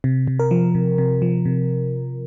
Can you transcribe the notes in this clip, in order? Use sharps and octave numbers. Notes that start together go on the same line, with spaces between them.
C3
C3
A#4
F3
C3
C3
F3
C3